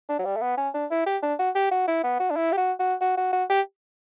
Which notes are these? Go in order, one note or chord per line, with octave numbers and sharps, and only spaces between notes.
D4
F#3
G3
A3
B3
C#4
D4
E4
G4
D4
F#4
G4
F#4
E4
B3
F#4
D4
E4
G4
F#4
F#4
F#4
F#4
F#4
G4